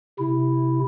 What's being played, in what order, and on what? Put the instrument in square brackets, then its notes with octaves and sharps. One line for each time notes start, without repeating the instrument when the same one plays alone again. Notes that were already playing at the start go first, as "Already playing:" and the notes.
[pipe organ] C3 E4